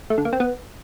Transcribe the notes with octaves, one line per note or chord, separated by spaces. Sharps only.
A3
D3
A#3
C4
B3